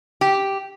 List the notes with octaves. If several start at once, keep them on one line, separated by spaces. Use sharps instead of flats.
G4